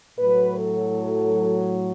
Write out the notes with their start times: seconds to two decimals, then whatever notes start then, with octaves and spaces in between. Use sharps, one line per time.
0.18 A2 F#3 B4
0.59 A4